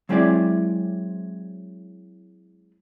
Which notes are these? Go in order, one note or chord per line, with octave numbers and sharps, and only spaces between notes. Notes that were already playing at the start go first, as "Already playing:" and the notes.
F#3 G#3 C4 E4 G#4 D5